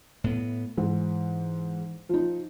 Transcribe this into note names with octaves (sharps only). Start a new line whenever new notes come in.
A2 B3
G#2 E3
F3 D#4